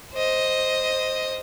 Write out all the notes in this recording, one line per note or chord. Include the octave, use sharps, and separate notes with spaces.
C5 D#5